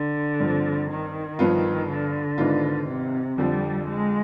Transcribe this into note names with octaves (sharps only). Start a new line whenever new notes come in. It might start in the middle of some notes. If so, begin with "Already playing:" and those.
Already playing: D3
G2 F3 C4
D#3
G2 F3 B3 F4
D3
G#2 D#3 B3 D4 F4
C3
F2 D3 F3 G3
G#3